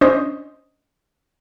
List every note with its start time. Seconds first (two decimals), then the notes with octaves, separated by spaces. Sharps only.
0.01 C#4 D4 C5 D#5